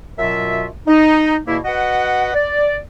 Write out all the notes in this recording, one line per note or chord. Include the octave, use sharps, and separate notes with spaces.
F#2 B2 F#3 F4 E5
D#4
E2 B2 A#3 E4
F#4 B4 D#5 F#5
D5